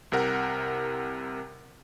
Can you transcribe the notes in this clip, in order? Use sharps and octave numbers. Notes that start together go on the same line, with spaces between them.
C2 C3 A#4 F#5